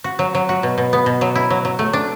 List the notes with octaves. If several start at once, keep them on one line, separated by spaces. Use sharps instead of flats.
F#4
F#3
F#3
F#4
B2
B2
B3
B2
F#3
E4
F#3
F#3
A3
D4